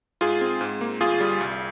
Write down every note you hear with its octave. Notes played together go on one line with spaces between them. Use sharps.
G#2 F4 G#4
C4
G#2
A#3
G1 F4 G#4
G3
C2